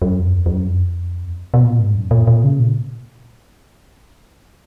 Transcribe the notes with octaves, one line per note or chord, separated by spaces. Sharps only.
F#2
F2
F2
F#2
F2
B2
A#2
G#2
F#2
A#2
A#2
C#3
A#2